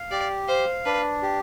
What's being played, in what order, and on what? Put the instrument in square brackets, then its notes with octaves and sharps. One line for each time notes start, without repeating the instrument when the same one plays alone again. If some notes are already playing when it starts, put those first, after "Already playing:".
Already playing: [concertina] F5
[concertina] G4 [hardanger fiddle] D5
[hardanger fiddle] C5 [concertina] F5
[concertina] D4 [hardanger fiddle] B4
[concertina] G4